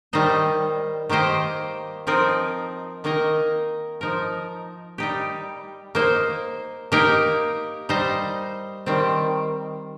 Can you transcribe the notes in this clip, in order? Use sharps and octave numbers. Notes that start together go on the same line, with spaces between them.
D#3 G3 D#4 C5 D#5
D#3 A#3 G4 C5 D#5
F3 C4 D#4 A#4
D#3 A#3 D#4 A#4 D#5
F3 D#4 A#4
G3 D#4 G4
A#3 D#4 C5
A#3 D#4 G4 A#4
G3 D#4 C5 D#5
D#3 G3 C4